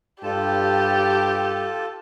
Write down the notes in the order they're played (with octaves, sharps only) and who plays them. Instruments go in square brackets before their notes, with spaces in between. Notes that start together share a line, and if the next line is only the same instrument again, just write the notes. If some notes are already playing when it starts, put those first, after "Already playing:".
[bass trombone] G2 [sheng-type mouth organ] F4 A4 A5 [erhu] G4